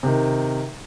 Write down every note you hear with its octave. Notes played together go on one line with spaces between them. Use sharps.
C3 D#3